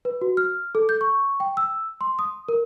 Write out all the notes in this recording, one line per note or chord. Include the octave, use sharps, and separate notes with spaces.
B4
F#4
F6
A4
G6
C#6
G5
E6
C6
D#6
A#4